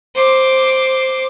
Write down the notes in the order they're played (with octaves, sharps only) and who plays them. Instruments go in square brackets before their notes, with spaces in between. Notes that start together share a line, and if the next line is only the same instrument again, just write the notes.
[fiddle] C5 D6